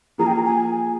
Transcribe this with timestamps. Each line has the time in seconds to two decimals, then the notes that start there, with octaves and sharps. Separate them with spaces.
0.18 F3 A#3 F4 G#4 A#5
0.27 G5
0.35 A#5
0.45 G#5